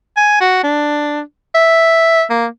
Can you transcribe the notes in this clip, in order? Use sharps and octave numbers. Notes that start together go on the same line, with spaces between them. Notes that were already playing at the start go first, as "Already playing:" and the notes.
G#5
F#4
D4
E5
A#3